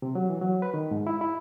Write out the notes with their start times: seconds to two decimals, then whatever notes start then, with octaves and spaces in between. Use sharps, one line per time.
0.02 C3
0.15 F#3
0.29 E3
0.41 F#3
0.62 B4
0.74 D#3
0.91 G#2
1.07 E4
1.21 E4